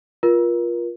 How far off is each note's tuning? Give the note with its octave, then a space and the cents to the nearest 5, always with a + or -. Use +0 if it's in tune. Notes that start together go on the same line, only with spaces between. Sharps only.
F4 +0 A#4 +35